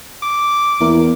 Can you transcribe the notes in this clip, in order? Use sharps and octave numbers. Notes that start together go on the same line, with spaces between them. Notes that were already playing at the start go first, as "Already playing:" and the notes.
D6
E2 A#3 E4 A#4